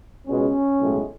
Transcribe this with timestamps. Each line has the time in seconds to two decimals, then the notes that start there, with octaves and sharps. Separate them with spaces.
0.27 C#2 B2 G#3 C#4
0.79 B1 A2 G#3